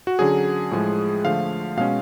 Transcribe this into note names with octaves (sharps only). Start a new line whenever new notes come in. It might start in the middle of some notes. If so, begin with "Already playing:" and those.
F#4
D3 F#3 C#4 G#4
A2 F3 G#3
D3 F3 A3 F5
B2 G#3 C#4 F5